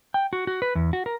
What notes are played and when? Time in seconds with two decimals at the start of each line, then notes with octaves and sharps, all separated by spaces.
0.14 G5
0.33 F#4
0.47 F#4
0.62 B4
0.75 E2
0.93 F#4
1.06 A#4